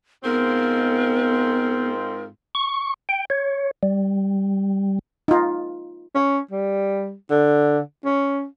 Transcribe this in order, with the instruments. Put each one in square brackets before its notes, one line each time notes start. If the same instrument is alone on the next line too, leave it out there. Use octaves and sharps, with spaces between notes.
[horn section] G#2 C4 F4 [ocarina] B3 [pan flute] A#4
[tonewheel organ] C#6
G5
C#5
G3
[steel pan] D#4 F4
[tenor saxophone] C#4
G3
D3
C#4